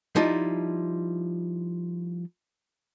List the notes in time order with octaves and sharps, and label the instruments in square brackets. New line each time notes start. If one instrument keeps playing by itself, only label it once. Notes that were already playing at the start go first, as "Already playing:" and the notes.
[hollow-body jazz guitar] F3 G3 D#4 E4